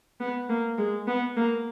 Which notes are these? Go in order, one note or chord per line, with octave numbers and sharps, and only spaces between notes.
B3
A#3
G#3
B3
A#3